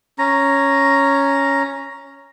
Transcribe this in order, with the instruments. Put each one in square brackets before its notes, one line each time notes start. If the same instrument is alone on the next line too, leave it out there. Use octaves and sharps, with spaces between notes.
[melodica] C#4 A#5